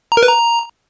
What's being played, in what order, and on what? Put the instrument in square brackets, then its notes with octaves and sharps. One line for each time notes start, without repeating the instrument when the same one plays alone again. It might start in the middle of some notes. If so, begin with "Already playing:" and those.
[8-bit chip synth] A#5
A#4
B4
A#5